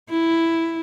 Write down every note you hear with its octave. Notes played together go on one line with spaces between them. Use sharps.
E4